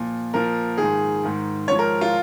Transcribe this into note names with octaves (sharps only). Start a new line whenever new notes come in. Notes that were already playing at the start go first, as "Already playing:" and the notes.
Already playing: A#2 F3
A#2 F3 A#4
G#2 D#3 G#4
G#2 D#3
G#2 F3 C#5
A#4
F4